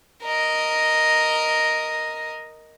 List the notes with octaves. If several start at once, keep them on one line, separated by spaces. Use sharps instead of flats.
A#4 D#5